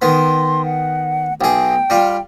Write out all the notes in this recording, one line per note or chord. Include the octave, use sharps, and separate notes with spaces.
D#3 B3 C6
F#5
B1 G#4 G5
G3 F4